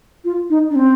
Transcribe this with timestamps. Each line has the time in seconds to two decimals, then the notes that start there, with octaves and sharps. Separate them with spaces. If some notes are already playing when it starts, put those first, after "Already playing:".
0.24 F4
0.50 D#4
0.70 D4
0.75 C4